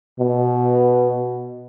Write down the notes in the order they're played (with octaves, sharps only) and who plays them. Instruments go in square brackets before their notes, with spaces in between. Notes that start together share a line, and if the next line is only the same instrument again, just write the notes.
[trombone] B2